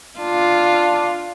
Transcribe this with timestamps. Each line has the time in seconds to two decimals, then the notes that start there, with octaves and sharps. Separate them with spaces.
0.20 D4 F4